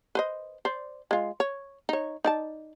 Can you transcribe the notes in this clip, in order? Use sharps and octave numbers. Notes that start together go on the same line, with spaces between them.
B4 C5 D#5
C5 D5
G#3 F4
C#5
D#4 C#5
D#4 D5 A5